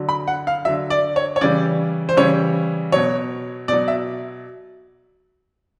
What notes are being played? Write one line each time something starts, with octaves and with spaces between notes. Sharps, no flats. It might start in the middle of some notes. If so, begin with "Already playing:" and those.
Already playing: D3 F#3
B5
F#5
F5
D3 F#3 E5
D5
C#5
C#5
C#3 E3 G3 D5
C5
C#3 E3 G3 C#5
B2 F#3 C#5
B2 F#3 D5
E5